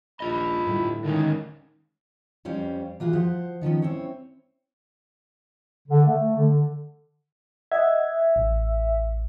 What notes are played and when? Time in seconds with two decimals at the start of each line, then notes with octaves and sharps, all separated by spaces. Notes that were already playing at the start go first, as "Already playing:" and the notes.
0.20 A#1 F4 D#5 B5
0.67 G1 A2 A3
1.04 D3 D#3 G#3 C#4
2.45 F2 G3 C#4 C5 F5
3.00 E3 F4 F#4 G#4
3.13 F3 C5 F#5
3.61 D#3 F3 B3 C#4
3.82 C4 C#4 E4 C#5
5.88 D3
6.06 A3
6.37 D3
7.72 D#5 E5 F#5 G#6
8.36 A1